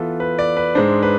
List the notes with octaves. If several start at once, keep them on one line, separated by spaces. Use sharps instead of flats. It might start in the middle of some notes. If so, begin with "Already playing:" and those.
Already playing: E3 B3 F4 A4 B4
B4
D5
B4
G#2 G#3 D4 C5
B4